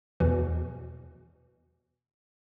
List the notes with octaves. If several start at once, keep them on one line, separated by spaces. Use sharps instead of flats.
E2 B2 E3